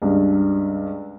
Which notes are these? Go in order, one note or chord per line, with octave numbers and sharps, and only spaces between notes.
C#2 G2